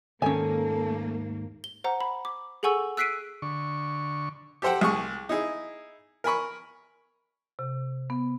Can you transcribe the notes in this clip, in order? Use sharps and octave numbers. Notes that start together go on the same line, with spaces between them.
D#2 G#2 D#3 A#3 C#4 A4 G#5
G7
C5 F#5 A#5
B5
D6
G#4 A4 F#5 G#5 C#6 E6
E6 F#6 B6 C7 D7 D#7
D3 C#6
G4 A4 C5 F#5 G5
C2 G#4 C#6
D#4 E4 G#4
A#4 G#5 B5 C#6
C3
B3